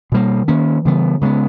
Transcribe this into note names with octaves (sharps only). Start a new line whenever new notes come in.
B2 G3 A#3
D#3 A#3 C#4
C#3 E3 G3 B3
C#3 G#3 B3